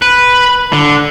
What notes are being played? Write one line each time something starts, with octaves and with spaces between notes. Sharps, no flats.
B4
D3